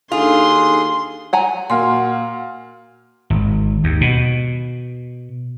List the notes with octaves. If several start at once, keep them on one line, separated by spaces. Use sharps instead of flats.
D#2 D4 D#4 F4 G#4 A4 C6
F#5 G#5 A#5
A#2 F#4 F5 C6
G#1
D#2
B2